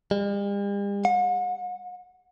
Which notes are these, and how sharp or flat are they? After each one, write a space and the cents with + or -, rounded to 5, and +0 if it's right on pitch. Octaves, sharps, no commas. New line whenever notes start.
G3 +45
F#5 -40